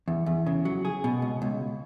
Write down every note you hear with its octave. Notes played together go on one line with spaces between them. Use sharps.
E2
E2
C#3
F#3
G#4
B2
C#2
C#2